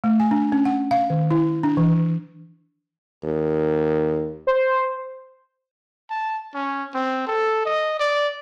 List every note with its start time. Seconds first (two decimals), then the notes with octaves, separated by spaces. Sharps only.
0.04 A3
0.20 G#5
0.31 D4
0.52 C#4
0.65 F#5
0.91 F5
1.10 D#3
1.31 E4
1.63 D4
1.77 E3
3.24 D#2
4.47 C5
6.10 A5
6.54 C#4
6.94 C4
7.27 A4
7.66 D#5
8.00 D5